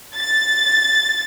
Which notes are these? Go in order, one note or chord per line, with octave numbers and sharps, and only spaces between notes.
A6